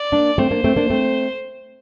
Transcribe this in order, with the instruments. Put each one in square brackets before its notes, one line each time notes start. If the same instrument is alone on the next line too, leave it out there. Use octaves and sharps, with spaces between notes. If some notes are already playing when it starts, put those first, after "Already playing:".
Already playing: [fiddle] D5
[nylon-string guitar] A#3 D4
[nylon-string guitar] A3 C4 [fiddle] C5
[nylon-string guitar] A#3 D4
A3 C4
A#3 D4
A3 C4